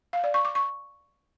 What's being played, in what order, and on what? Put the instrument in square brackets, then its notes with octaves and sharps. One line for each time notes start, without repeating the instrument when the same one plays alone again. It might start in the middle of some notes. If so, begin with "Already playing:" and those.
[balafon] F5
D5
C#6
D6
C#6